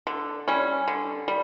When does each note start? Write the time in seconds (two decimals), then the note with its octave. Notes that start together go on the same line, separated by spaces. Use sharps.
0.07 D3
0.48 G3 C#4
0.88 D3
1.28 G3